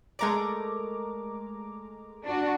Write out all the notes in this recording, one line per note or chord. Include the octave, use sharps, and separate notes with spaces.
G#3 A3 A#4 D5 A#5 D6
D4 F#4